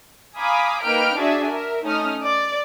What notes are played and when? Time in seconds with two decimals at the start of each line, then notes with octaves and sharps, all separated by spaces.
0.38 F5 G#5 A#5 B5 D6 D#6
0.82 A#3 D#4 B4 G5 F6 D7
1.17 D4 F#4 G#4 D5 E5 G#5
1.51 A#4 E5
1.84 A3 C#4 D#4 D#6 F6
2.24 D5